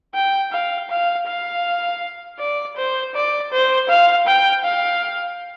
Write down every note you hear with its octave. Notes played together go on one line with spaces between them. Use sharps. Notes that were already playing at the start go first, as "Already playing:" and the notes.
G5
F5
F5
F5
D5
C5
D5
C5
F5
G5
F5